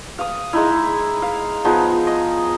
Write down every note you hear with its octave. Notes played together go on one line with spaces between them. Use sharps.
F5 D#6
G#3 D#4 E4
F5
F3 B3 D#4 G#4
D#5